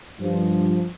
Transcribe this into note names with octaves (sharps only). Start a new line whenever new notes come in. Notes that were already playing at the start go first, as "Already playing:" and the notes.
G2 F3